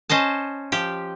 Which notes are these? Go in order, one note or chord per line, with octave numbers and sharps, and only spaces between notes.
C#4 C5 D#5 A5
F3 G4